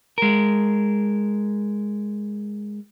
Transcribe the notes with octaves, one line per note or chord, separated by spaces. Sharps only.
G#3 A#4